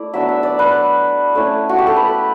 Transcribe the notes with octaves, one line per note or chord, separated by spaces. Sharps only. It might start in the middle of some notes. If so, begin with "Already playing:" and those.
Already playing: A3 E4 D5
F#3 B3 D4 E5
E5
D5
B4
A3 C#4 E4
F#4
G4
A4
B4